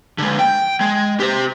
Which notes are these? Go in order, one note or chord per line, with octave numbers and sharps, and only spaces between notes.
D3 G#3
G5
G#3
G4 C5